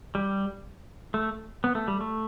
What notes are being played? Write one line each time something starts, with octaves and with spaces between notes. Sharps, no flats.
G3
A3
B3
A3
G3
A3